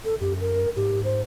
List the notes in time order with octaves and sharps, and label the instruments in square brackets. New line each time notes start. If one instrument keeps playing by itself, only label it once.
[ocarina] A4
[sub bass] F#2 [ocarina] G4
[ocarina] A#4
[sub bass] G#2 [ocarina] G4
[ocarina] C5